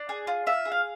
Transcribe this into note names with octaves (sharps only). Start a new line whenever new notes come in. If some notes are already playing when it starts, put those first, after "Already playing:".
Already playing: D4 D5
G#4
F4
F4 E5
G#4
F5